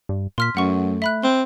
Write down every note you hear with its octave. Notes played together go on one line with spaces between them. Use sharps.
G2
A#2 C6 F6 B6
F#2 A3 F#5 C#6
E5 B5 F#6
C4 C6